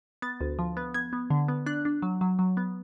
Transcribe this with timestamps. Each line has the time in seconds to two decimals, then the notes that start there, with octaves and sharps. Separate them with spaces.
0.22 B3 A6
0.41 D2
0.59 F3
0.77 B3
0.94 B3 G#6
1.13 B3
1.30 D3
1.48 B3
1.66 D4 F#6
1.85 D4
2.02 F#3
2.21 F#3
2.39 F#3
2.57 B3